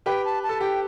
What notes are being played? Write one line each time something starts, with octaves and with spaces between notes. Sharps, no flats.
G4 B4 G5
A5
A5
A4
G4 G5